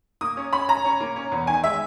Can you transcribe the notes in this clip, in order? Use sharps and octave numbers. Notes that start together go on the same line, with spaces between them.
A#3 D#6
C#4
C#4 B5
C#4 A#5
C#4
A#3
C#4
E2
D#3 G#5
G#3 E5